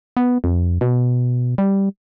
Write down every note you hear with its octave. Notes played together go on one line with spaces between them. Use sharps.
B3
F2
B2
G3